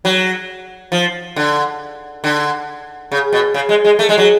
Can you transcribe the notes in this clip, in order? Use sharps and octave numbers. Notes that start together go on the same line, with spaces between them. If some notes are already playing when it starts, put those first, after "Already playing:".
F#3
F3
D3
D3
C#3
B2
C#3
G#3
G#3
A3
G#3
F#3